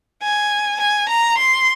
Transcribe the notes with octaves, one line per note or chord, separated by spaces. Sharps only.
G#5
G#5
A#5
C6